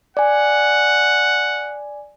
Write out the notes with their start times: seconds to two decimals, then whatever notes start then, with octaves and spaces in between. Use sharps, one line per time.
0.17 D5 F#5 G#5